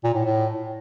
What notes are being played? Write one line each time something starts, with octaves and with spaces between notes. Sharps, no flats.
A#2
A2
A2